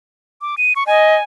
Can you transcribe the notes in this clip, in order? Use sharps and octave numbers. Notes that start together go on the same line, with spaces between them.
D6
D#7
C#6
D#5 G#5